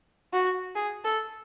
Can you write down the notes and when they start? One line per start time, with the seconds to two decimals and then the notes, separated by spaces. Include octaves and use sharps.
0.33 F#4
0.75 G#4
1.04 A4